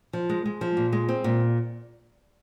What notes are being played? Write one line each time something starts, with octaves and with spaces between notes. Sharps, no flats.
F3
G#3
G#3
F3
A#2
G#3
C4
A#2